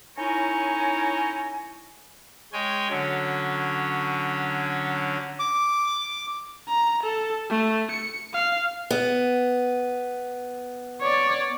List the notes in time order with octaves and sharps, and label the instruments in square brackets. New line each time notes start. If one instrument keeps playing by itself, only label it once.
[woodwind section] C#4 D#4 E4 A#4 C#5 G#5
[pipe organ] G#3 C#5 G5 G#5
D3 F#3 C#4
[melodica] D6
[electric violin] A#5
A4
A3
C#7
F5
[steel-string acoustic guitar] B3
[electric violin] C#5 D5